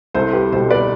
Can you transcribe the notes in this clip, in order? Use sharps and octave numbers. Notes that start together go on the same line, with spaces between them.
C2 A4 C5
G4 B4
B2 G3 A4 C5
B4 D5